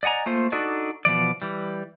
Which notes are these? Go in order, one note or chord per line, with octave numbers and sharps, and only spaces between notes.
D5 D#5 F#5 G#5 A#5
A3 A#3 F4 C5
D4 D#4 F#4 A4 D5 D#5
B2 E3 F3 D5
E3 G3